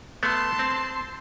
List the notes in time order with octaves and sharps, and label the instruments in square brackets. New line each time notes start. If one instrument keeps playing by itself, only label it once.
[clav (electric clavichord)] A3 B3 [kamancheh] A5 C6
[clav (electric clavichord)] C4